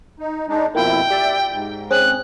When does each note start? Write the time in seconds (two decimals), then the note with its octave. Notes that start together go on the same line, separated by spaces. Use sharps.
0.19 D#4
0.48 G#3 D4 D#4
0.75 F2 B2 A#3 E4 F4 G5
1.10 G4 D5 E5
1.53 G#2
1.91 C4 C#4 G#4 F#6